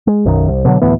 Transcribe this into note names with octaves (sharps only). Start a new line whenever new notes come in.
G#3
B1 F#2 D#3
C2
B2 D3 E3 F#3
D2 A2 E3 B3